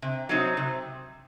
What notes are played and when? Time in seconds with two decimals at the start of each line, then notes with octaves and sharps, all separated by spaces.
0.02 C3
0.29 F#3 C4 D#4
0.57 C3